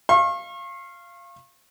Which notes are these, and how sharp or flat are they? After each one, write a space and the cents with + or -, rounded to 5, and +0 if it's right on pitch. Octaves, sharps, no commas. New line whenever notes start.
F5 -15 C#6 -40